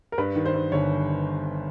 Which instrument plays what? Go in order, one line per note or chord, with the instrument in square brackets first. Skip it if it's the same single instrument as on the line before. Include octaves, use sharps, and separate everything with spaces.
[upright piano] A#4
G2 B4
D#3
C5
G2
G1 C#5